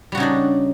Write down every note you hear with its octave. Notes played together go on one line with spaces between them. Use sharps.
C#3 G3 D4 D#4 F#4